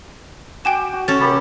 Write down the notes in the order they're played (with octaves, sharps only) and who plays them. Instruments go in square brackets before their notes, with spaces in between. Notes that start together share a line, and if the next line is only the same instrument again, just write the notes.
[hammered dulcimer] F#4 G4 [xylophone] G5 G#5 E7
[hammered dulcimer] F#4
[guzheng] C#4 A4 [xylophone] A6
[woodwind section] C3 B5 [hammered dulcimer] A#3 G4 A#4